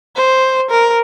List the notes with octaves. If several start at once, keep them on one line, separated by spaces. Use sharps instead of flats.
C5
A#4